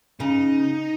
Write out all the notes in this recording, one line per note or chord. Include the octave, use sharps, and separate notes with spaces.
C#3 D#4